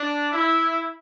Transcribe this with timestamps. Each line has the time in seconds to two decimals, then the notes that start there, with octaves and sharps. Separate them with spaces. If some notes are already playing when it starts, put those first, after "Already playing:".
Already playing: D4
0.32 E4